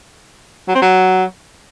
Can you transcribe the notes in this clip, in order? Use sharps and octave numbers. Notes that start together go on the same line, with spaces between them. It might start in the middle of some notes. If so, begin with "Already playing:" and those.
F#3
C4
F#3